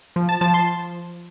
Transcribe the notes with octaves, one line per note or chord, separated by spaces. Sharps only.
F3
A5
F3 A5
C6